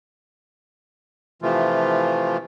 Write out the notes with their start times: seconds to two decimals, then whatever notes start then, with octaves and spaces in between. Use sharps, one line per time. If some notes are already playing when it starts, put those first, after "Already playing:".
1.42 C3 E3 F3 A3 F4